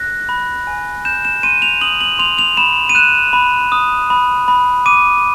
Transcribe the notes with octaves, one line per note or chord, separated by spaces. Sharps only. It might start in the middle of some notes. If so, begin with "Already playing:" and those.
Already playing: F#6 A#6
B5
G#5
G6 E7
E7
C6 D#7
F7
D#6 F#7
F#7
C6 F7
F7
B5 E7
D#7
F#6 E7
B5
D#6
B5
B5
D6 D#7